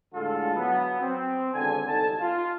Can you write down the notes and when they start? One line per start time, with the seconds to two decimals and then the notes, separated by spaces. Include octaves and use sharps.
0.15 A2 D3 G#3 F4 A4
0.55 F#3 B3
1.01 C4
1.53 G#1 E2 D3 G#5
1.88 C2 D#4 A4 A5
2.20 F4